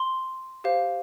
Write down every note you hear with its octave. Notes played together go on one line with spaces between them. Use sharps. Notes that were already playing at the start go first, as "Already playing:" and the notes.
Already playing: C6
G4 C5 F5